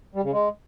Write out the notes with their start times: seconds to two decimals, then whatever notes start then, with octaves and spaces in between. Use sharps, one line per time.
0.15 G3
0.24 C#3
0.33 G#3